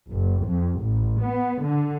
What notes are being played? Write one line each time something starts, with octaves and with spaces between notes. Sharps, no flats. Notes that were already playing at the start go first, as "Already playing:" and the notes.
F#1
F2
A1
B3
D3